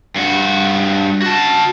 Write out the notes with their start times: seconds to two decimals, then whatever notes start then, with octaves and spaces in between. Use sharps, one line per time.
0.16 G2 F#4
1.22 F#4 A5